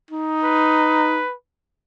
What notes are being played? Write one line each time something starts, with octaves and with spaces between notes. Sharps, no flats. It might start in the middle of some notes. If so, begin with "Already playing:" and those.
D#4
B4